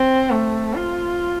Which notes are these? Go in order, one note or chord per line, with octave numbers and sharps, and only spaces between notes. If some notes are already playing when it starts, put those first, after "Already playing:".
Already playing: C4
A3
F4